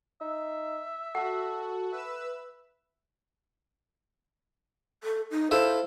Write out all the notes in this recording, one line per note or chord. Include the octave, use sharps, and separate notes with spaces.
D#4 E5
F#4 A4 F#5 A5
B4 E5 E6
A4
D#4
E4 F4 A4 C5